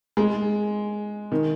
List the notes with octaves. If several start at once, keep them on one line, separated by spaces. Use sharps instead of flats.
G#3
D#3